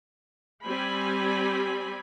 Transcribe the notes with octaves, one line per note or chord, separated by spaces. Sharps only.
G3 C4 G4 G#5 B5